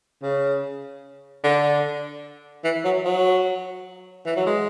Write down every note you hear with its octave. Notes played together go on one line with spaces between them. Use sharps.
C#3
D3
E3
F#3
F#3
E3
F#3
G#3